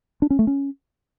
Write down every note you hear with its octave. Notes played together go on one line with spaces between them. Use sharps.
D4
C#4
A3
C#4